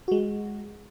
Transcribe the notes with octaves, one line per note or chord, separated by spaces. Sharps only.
G#3 F#4